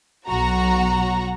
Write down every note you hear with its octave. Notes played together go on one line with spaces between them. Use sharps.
B1 F#3 F#4 A#5